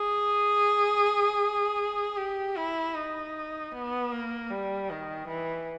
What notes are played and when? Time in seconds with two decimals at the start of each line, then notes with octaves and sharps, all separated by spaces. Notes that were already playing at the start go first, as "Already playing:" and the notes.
Already playing: G#4
2.17 G4
2.56 E4
2.95 D#4
3.72 B3
4.12 A#3
4.50 G3
4.90 D#3
5.28 E3